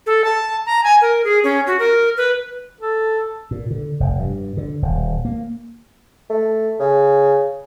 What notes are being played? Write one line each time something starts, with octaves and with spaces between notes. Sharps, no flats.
A4
A5
A#5
G#5
A#4
G#4
C#4
F#4
A#4
B4
A4
A#2
D3
F1
G2
D3
D#1
A#3
A3
C#3